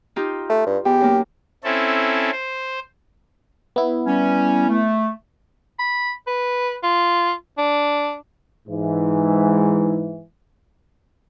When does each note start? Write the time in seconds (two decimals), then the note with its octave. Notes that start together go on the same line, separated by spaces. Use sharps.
0.16 D#4 F4 G4
0.50 A3
0.67 G2
0.85 E2 G4
1.01 F#2 A#3
1.64 C4 C#4 E4 A4
2.31 C5
3.76 B3 E4
4.06 G3 C#4
4.69 A3
5.79 B5
6.27 B4
6.83 F4
7.58 D4
8.68 G#2 E3